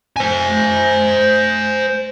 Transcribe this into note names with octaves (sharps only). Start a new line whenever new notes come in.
C5 G#5